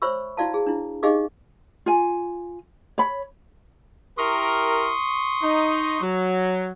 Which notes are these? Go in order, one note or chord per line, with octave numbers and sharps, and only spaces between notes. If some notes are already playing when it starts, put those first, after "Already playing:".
C5 C#5 E5 B5 C#6 E6
E4 F#4 D5 F5 A5
G#4
D4 E4
D#4 G4 G#4 D#5 F5 D6
F4 G#5
C#5 B5
E4 G4 A#4 C6 C#6 D#6
D#4
F#3